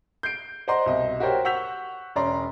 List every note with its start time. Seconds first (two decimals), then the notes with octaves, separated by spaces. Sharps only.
0.23 G6 C7 D7
0.68 C5 D5 D#5 F#5 A#5 C6
0.86 C2 B2 D#5
1.20 F#4 G4 A#4 C5 C#5
1.45 F#5 C#6 E6 G6 B6 F7
2.16 E1 C#4 D5 A#5 C6